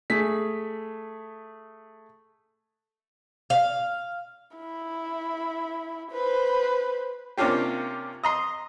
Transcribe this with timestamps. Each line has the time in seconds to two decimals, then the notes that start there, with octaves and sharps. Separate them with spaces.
0.10 A3 G#4 B6
3.50 F5
4.57 E4
6.11 B4 C5
7.37 C3 A#3 C#4 D4 F4 G4
8.23 D#5 A#5 C6